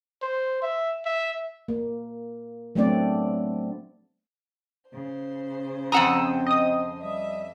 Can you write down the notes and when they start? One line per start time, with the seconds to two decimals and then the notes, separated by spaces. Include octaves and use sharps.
0.22 C5
0.62 E5
1.06 E5
1.68 A#3
2.75 F#3 A3 B3 C4 D4 D5
4.89 C#3 C5
5.92 F2 C4 F#5 A#5 D#6 E6
6.46 D#5 D#6
7.03 G3 E5